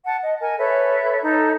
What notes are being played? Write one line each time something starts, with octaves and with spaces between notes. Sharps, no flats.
F#5 A5
D#5
A#4 G#5
A4 B4 C#5 E5
D#4 A4 A#5